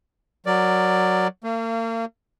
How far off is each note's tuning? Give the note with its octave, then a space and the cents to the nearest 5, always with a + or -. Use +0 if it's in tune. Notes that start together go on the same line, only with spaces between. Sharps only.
F#3 +0 A#4 +0 D5 +5
A#3 -40 F5 -30